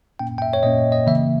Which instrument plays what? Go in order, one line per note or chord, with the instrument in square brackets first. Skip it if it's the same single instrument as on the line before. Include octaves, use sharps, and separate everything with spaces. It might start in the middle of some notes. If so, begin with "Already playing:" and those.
[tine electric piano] A#2 A#3 C#4 G5
G5
E5
C#5
A#2 A#3 C#4 D#5
D#5
C#3 E3 A#3 E5